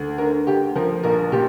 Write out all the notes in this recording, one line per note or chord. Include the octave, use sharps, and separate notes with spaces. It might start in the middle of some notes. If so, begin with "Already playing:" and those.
Already playing: D2
D3 A#4
D2 G4
F3 A#4
A#1 A#4
A#2 G4